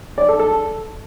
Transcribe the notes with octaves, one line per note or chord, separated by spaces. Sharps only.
D5
A4
A4